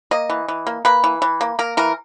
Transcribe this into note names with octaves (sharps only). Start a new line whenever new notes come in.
A#3 D#5
E3
E3
A#3
A#3 B4
E3
E3
A#3
A#3 A#4
E3 A#4